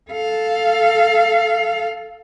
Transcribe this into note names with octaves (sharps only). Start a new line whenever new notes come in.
A4 F5